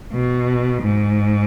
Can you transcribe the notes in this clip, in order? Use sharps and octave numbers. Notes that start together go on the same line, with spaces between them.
B2
G#2